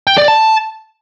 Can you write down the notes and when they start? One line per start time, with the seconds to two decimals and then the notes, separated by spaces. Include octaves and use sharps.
0.07 G5
0.18 D5
0.28 A5